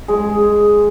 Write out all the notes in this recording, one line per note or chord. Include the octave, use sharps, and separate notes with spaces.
G#3